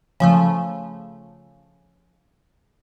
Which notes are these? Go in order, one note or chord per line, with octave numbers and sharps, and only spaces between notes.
C#3 F3 A3